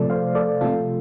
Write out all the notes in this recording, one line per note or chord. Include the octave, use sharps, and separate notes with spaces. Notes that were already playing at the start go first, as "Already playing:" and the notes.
Already playing: C3 F3 A3 A4 D5
C5 F5
A4 D5
C3 F3 A3 F4 A4